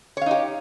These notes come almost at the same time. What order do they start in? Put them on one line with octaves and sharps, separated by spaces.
C#5 F5 D#4 G4